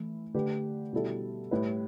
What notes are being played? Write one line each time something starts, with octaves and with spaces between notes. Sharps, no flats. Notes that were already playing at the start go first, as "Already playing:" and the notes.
Already playing: E3 A3 E4
D3 A3 G4 B4
B2 G3 E4 A4
A2 G3 E4 B4